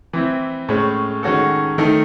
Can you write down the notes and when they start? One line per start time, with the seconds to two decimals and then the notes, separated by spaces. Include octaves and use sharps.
0.13 E3 C4 E4
0.69 A2 G#3 C#4
1.23 D#3 G#3 C#4 F#4 A4
1.78 D#3 A3 D#4 A4